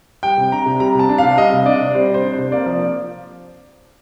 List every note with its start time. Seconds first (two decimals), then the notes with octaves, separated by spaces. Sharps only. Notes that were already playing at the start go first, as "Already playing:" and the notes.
0.23 G3 G5
0.37 C3
0.52 D4 A#5
0.66 C3
0.80 G3 A#5
0.95 C3 A5
1.09 D4
1.18 C3 F5
1.37 G3 D#5
1.52 C3
1.66 D4 D5
1.80 C3
1.94 G3 C5
2.10 C3 C5
2.24 D4
2.33 C5
2.39 C3
2.52 A#3 D5
2.66 F3